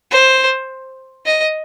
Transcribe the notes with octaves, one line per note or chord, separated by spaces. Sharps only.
C5
D#5